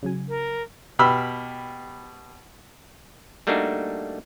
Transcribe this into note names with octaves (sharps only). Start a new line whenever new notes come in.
C#3 F#3 G#5
A#4
B2 G4 B5 E6 F6
G3 A3 A#3 D4 D#4 F#4